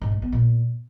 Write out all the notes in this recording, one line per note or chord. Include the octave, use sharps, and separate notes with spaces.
G#2
G#3
B3
A#2